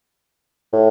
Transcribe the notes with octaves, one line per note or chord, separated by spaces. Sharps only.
A2